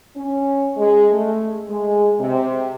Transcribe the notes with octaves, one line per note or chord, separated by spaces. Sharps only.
C#4
G#3
A3
G#3
C3